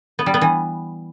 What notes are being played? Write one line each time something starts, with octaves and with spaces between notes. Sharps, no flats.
B3
G3
B3
E3